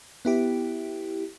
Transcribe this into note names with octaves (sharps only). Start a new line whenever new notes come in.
B3 E4 G4